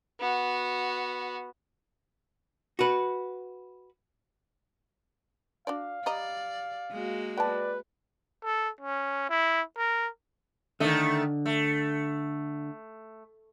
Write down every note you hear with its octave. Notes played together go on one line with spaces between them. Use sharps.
B3 F#4
F#4 B4
D4 F#4 D5 F5
G3 D5 D#5 A#5
G#3 A#3 F#4
B4 D5 G5 A5
A4
C#4
E4
A#4
D3 D#3 A3 D#5
A3